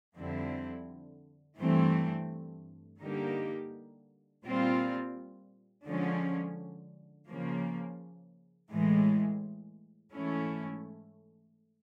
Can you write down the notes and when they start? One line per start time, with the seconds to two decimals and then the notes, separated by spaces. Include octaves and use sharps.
0.16 F2 D3 G3 C4 E4
1.59 G2 E3 A3 C4
3.01 D3 G3 A#3 D#4 G4
4.44 A#2 G3 C4 F4
5.86 D3 F3 G#3 C#4
7.29 C#3 F3 A#3
8.71 A2 E3 G#3
10.14 G#2 E3 A3 C#4 E4